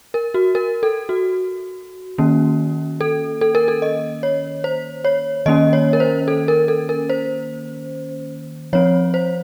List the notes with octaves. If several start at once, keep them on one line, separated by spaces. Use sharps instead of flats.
A#4
F#4
A#4
A4
F#4
D#3 A#3 C#4
A4
A4
A#4
A4
D#5
C#5
C5
C#5
D#3 A#3 C#4 D#5
C#5
A#4
C5
A4
A#4
A4
A#4
C5
F3 C4 C#5
C5